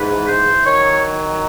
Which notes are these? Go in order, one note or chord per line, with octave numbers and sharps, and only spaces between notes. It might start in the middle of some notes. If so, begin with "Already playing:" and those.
Already playing: G#2 E3 B4
C5
D#3 F#3 C#5